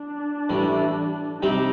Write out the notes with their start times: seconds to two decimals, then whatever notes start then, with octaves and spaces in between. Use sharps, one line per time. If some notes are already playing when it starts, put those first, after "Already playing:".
Already playing: D4
0.49 A1 A2 G3
1.42 C3 G3 C4 D#4 G4